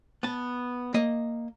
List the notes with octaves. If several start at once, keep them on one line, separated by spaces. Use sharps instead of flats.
B3 A5
A#3 D#5